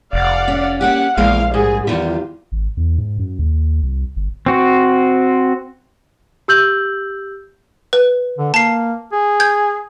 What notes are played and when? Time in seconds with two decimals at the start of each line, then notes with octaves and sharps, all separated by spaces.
0.13 F1 D5 F5 F#5
0.48 C#4
0.81 A#3 C#4 G4 F#5
1.17 A#1 E2 G#3 A#3 F5
1.54 G#2 G3 G#4
1.87 E2 D#3 F4 G4
2.52 G#1
2.77 E2
2.98 G#2
3.18 F#2
3.39 D#2
3.83 C2
4.16 G1
4.46 C4 F#4
6.48 G4 E6 G6 F#7
7.93 B4
8.38 D3
8.54 A#3 A5 C7
9.13 G#4
9.40 G6 G#6